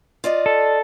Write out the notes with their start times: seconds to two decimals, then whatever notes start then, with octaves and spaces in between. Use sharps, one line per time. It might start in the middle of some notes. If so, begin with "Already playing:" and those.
0.24 F4 D5 D#5
0.46 A4